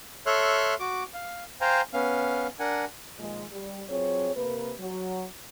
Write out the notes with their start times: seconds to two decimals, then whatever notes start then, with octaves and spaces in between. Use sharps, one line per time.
0.26 A4 C#5 E5 C6 F6 F#6
0.80 F#4 D6
1.14 F5
1.61 C5 F5 G5 G#5 A#5
1.93 B3 C#4 F5
2.60 D4 A#4 F#5 G#5
3.18 A#2 D#3 F3 G#3
3.52 G3
3.89 F#3 C4 F4 G#4 C#5
4.36 C3 A#3 A#4 B4
4.80 F#3